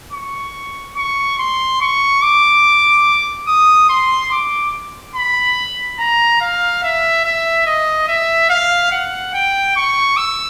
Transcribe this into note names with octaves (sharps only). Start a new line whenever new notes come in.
C#6
C#6
C6
C#6
D6
D#6
C6
D6
B5
A#5
F5
E5
E5
D#5
E5
F5
F#5
G5
C#6
E6